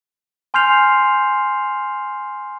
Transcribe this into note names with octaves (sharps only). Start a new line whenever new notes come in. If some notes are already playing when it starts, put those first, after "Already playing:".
G#5 C6 F6 G6 C7 F7